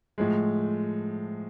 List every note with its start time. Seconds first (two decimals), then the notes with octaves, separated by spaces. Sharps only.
0.18 A2 F3 G#3